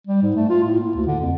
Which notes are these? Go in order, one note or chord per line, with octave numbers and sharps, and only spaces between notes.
G3
G#2
A3
F4
A2
A#3
D2
D3
F2